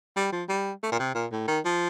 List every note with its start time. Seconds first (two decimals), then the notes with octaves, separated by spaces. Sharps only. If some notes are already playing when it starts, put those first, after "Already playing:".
0.16 G3
0.32 F3
0.49 G3
0.83 A3
0.92 A#2
0.99 C3
1.15 A#2
1.32 A2
1.48 D#3
1.65 F3